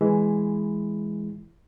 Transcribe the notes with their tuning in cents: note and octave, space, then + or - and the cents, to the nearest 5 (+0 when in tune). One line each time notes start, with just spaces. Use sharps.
E3 +5 G#3 +0 E4 +5